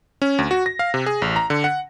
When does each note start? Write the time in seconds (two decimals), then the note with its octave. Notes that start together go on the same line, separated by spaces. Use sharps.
0.22 C#4
0.39 D2
0.51 F#4
0.66 A#6
0.79 F5
0.94 C3
1.06 G#4
1.22 A1
1.36 A#5
1.50 D3
1.64 F#5